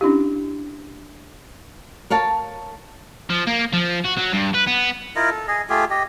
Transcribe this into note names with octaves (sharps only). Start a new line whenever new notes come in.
C#4 D4 E4 G4
A#4 C#5 F5 A5
F3
A#3
F3
F#4
F#3
G2
B4
B3
E4 F4 A#4 D#5
A4
G#4 D#5
A3 F4 G4 G#4
G4 D#5